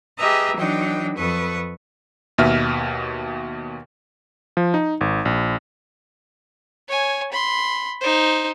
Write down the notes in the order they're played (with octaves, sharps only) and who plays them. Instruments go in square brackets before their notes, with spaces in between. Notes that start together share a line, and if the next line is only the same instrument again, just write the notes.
[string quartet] G4 G#4 B4 D#5 E5 A#5
E3 F#3 D4 D#4 G5
F2 A4 B4 C#6 D#6
[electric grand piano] D#2 B2 E5 F6
F3
D#4
G#1
A#1
[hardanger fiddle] C#5 G#5
B5 C6
D#4 C5